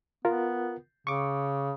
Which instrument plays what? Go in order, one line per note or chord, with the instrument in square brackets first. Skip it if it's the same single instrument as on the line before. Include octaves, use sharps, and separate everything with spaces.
[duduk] B3 [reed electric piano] F4 A#4
[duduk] C#3 [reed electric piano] C#6 D6